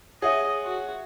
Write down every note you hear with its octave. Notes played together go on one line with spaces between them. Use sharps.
G#4 C#5 D#5 E5 F#5
F#4